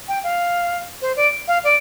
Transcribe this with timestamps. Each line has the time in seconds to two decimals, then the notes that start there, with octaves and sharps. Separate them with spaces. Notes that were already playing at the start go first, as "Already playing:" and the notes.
0.08 G5
0.23 F5
1.02 C5
1.16 D5
1.48 F5
1.64 D5